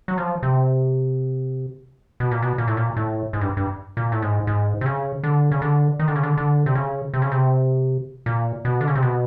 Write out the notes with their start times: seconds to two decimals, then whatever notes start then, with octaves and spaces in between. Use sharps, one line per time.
0.08 F#3
0.18 F3
0.43 C3
2.20 B2
2.31 A#2
2.43 B2
2.58 A#2
2.67 A2
2.77 A#2
2.97 A2
3.33 G#2
3.41 G2
3.57 G2
3.97 A#2
4.12 A2
4.22 G#2
4.47 G#2
4.81 C3
4.86 C#3
5.24 D3
5.52 C#3
5.62 D3
5.99 D#3
6.08 D3
6.16 C#3
6.23 D3
6.37 D3
6.66 C3
6.75 C#3
7.14 C3
7.22 C#3
7.32 C3
8.26 A#2
8.65 B2
8.81 D3
8.88 C#3
8.95 C3
9.02 B2